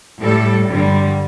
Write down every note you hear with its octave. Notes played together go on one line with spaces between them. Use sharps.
A2 G3 A4
G2 D3 G3